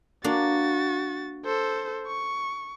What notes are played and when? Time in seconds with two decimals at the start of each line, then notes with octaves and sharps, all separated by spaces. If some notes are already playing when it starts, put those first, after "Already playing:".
0.24 A#3 D4 F#4 A6
1.45 A4 C5
2.06 C#6